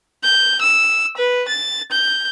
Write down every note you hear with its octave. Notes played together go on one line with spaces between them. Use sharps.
G6
E6
B4
A6
G6